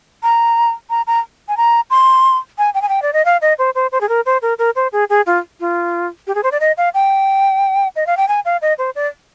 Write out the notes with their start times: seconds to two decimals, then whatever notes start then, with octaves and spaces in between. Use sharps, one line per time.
0.23 A#5
0.90 A#5
1.07 A#5
1.48 G#5
1.57 A#5
1.90 C6
2.58 G#5
2.74 G5
2.82 G#5
2.89 G5
3.02 D5
3.13 D#5
3.25 F5
3.42 D#5
3.58 C5
3.75 C5
3.92 C5
4.01 G#4
4.09 A#4
4.26 C5
4.42 A#4
4.59 A#4
4.76 C5
4.92 G#4
5.10 G#4
5.26 F4
5.60 F4
6.27 G4
6.35 G#4
6.43 C5
6.52 D5
6.60 D#5
6.77 F5
6.94 G5
7.96 D#5
8.06 F5
8.17 G5
8.28 G#5
8.45 F5
8.62 D#5
8.78 C5
8.95 D5